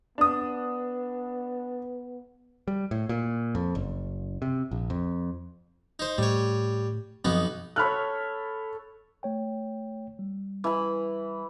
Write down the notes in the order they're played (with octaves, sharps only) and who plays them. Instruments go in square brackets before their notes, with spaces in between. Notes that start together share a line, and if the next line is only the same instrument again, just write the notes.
[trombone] B3 [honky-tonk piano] D4 D#6
[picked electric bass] G3
A2
A#2
F2
F#1
C3
A#1
F2
[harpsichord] D#4 C5
[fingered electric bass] A2 [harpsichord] G3 C#5
[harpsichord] B1 B3 D#4 [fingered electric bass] F#2 F3 C4
[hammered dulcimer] A4 C#5 [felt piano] B5 F6 F#6
[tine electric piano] A3 C#5 G5
G3
[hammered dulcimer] E3 B5